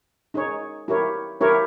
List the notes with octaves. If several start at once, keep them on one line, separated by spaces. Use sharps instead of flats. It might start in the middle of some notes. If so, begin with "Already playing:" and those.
D#4 G#4 C#5
E4 G4 A#4 C#5
E4 G4 A#4 C#5